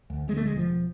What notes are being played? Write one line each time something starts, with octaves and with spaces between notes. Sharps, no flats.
D2
D2 G#3
A3
E1 G#3
F3
E1